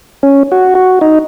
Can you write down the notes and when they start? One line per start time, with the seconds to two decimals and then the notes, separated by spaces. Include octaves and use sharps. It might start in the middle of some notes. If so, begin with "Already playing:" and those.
0.23 C#4
0.52 F#4
0.75 F#4
1.01 D#4